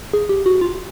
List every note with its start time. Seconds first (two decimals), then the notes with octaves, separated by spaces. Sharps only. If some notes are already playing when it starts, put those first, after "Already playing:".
0.13 G#4
0.29 G4
0.46 F#4
0.61 F4